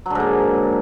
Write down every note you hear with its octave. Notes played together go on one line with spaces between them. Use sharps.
G#2 D3 F#3 A#3